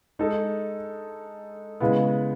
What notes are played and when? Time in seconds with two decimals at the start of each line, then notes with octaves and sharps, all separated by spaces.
0.19 G#3 D#4 A4
1.80 C#3 G#3 B3 E4